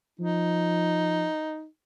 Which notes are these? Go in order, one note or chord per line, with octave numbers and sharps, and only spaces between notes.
F3 D#4